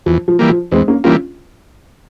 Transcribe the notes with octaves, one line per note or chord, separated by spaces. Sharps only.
E2 F3
F3
E3 G3 A#3
F3
E2 G#3 C4
A#3 C#4
E3 G3 A#3 C#4 F4